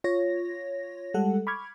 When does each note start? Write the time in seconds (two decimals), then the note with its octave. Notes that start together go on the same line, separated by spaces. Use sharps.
0.04 F4 C#5 A#6
1.14 G3 G#3 A4 F#5
1.47 B5 C#6 D6 F6 G#6